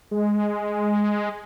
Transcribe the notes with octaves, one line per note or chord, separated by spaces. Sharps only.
G#3